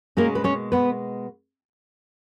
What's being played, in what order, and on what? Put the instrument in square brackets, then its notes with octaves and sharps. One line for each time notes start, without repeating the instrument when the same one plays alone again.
[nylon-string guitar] B2 G#3 A#3 C#4 A#4
B4
C#4 C#5
B3 B4